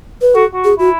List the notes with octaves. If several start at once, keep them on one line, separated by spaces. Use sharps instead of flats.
B4
F#4 A4
F#4
G#4
E4 F#4